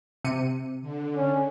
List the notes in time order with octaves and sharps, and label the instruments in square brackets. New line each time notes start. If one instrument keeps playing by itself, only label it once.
[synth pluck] C3 C#7 D#7
[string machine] D3
[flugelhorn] C#4